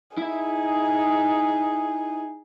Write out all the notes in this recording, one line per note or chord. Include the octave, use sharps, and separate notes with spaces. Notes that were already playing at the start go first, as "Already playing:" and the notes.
D#4 E4 G#4 E5